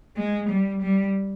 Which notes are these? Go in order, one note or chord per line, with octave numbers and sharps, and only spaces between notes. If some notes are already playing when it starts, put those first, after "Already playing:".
G#3
G3
G3